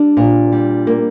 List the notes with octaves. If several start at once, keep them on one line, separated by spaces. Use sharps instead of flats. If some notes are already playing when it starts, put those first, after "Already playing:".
Already playing: G3 D4
A#2
G3
A#3